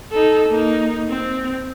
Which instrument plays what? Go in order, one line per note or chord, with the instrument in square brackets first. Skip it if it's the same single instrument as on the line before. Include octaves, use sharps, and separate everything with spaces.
[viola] D#4 A4
A#3 D#4
C4